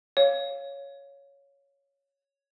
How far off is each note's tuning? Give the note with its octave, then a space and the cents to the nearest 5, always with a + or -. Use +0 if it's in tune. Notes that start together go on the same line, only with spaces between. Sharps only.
C#5 +5 F5 +0